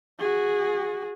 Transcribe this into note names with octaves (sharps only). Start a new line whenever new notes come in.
F#4 G#4